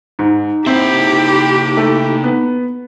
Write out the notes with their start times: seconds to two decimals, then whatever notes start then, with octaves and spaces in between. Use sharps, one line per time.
0.19 G#2 D#4
0.67 A#3 C4 E4 G4 E5
1.77 A3
2.24 B3